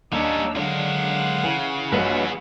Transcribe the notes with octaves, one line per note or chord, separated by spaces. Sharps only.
D#2 G3 C#4 D4 D#5 A5 A#5 E6
D3 F#3 G#3 D4 A#4 F5 F#5
C#3 E3
A#1 G2 B3 F#4 G#4 B4 C#5 D#5